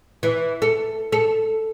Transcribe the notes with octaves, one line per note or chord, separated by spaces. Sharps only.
E3
A4
A4